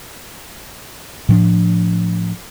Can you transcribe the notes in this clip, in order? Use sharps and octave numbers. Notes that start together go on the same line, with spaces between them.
A2 F3 D4